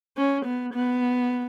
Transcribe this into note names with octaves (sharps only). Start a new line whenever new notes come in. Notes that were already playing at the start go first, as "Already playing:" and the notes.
C#4
B3
B3